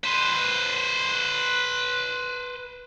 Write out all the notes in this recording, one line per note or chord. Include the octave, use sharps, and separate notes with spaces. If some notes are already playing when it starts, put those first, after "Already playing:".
B4 C5